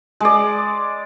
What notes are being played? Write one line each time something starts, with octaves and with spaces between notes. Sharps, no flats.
G#3 D5